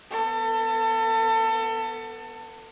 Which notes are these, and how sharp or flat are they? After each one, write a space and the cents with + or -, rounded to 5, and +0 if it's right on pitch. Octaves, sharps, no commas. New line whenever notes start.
B3 +0 A4 +30